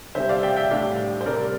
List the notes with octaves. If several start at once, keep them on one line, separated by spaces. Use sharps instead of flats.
C3 G3 C4 C5 E5
D5 F5
E5 G5
E5 G5
A2 G3 D4 D5 F5
C5
C3 G3 C4 A#4 D5